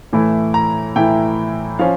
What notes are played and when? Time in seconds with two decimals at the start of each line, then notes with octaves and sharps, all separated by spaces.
0.13 A2 E3 A3 E4
0.54 A#5
0.96 A2 E3 A3 E4 G5
1.79 F3 C#4 F5